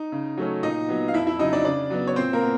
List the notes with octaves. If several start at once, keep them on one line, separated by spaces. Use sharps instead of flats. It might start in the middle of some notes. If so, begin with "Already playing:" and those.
Already playing: D#4
C#3
F#3 A3 C#4
A#2 D#4 D#5
F#3 B3
F5
F2 E4 E5
E4 E5
C#3 F#3 D#4 D#5
D4 D5
C#3 D4 D5
F#3 B3
C#5
A#2 C4 C5
A#3 A#4
B3